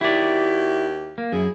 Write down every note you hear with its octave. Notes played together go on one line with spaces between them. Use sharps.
D#2 E4 F#4 G4 D5
A#3
F#2 E4 G#4